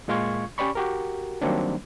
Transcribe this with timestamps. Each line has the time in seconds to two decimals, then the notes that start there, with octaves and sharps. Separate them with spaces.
0.08 A#2 G#3 F4 F5 C#6 G#6
0.58 C#4 G4 C#5 D5 B5 C#6
0.75 F#4 G4 A#4
1.42 D#3 F#3 G3 A#3 C4 D4